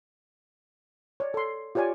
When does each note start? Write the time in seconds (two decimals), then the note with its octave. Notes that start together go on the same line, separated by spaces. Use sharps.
1.20 C#5 D5
1.34 A4 C6
1.75 F4 G4 C#5 D5 G#5